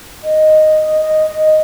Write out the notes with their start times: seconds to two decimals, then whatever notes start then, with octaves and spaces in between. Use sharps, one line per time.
0.24 D#5
1.02 D#5
1.27 D#5